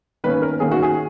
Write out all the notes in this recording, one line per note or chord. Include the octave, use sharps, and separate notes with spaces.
D#3 A#3 C#4 B4
A#4
D#3 A#3 C#4 G#4
F#4
G#4